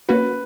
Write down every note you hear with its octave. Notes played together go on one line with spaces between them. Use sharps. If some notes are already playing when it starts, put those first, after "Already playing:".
A#3 C#4 F#4 B4